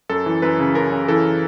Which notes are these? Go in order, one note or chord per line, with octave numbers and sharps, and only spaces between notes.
F#2 A4
E3
F#2 B4
C#3
F#2 A#4
C#3
E3 A4